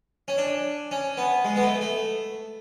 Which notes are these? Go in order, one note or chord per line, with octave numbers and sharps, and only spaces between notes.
C#4
D4
C#4
B3
G#3
B3
A3
A3